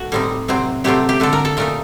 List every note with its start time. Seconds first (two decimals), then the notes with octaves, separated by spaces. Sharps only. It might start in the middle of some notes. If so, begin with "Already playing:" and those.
Already playing: A3 F#4
0.12 A2 G3 C4 D#4
0.48 C3 F#3 C4
0.84 C3 F#3 A3 C4 G4
1.09 G4
1.20 D3 A3 D4 A4
1.33 A#4
1.45 A4
1.57 A#2 A3 D#4 A#4